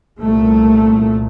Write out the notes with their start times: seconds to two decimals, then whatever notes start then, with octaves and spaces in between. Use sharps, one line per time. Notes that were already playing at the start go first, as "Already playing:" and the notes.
0.19 C2 A#2 A3